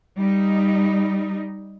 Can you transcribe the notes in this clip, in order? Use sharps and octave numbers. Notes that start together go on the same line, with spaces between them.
G3 D#4